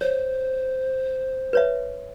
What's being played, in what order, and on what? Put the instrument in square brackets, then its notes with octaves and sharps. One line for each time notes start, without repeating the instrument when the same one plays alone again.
[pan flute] C5 [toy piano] C#5
[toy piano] B4 C#5 E5